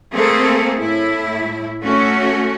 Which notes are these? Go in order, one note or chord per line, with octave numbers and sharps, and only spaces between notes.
A3 A#3 C4 G#4 A4
A2 E4
A3 C#4 F#4